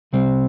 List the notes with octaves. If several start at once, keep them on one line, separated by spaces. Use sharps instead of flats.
C2 C3 G3 C4